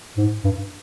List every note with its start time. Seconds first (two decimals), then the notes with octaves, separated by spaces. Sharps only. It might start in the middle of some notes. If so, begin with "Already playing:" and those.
0.18 G#2
0.44 G2